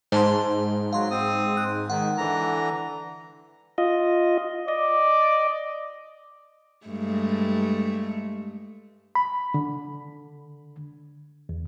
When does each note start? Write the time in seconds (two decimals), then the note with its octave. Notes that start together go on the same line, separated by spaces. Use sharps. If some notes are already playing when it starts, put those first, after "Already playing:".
0.12 G#2 C5 A5 C6
0.93 F#3 F5 C6
1.11 C4 D#6
1.57 F#6
1.90 D#3 F#5
2.18 D3 E3 A#5
3.78 F4 D#5
4.68 D5 D#5
6.86 G2 G#3 A3
9.15 B5
9.54 D3
11.49 E2